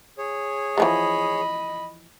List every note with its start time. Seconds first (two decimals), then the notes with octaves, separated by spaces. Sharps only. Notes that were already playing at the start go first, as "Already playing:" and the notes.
0.18 G#4 C#5
0.78 E3 F3 G#3 D#5 B5